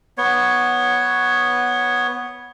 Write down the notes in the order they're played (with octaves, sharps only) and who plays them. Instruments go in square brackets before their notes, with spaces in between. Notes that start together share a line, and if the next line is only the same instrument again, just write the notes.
[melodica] B3 C#5